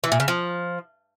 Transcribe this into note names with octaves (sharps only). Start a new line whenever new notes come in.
E3
A#2
C#3
F3